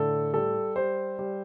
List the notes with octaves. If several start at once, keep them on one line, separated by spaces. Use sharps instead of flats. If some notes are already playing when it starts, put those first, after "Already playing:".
Already playing: A2 D3 A4
G3 A4
G3 C5
G3